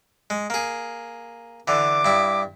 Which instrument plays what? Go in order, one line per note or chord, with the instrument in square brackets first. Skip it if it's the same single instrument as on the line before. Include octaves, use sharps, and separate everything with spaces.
[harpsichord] G#3
A#3 G#4
[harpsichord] D3 E3 [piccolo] D6
[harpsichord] G2 E4